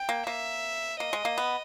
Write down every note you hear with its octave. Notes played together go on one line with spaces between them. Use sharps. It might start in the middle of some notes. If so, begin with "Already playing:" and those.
Already playing: G5
A#3
A#3 E5
A#3 D#5
G#3
A#3
B3